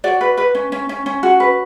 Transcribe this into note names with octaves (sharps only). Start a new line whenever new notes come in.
F#4 D5
B4
B4
C#4
C#4
C#4
C#4
F#4
B4